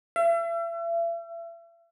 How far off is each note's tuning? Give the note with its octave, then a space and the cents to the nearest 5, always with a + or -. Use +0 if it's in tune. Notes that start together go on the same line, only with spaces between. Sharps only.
E5 +40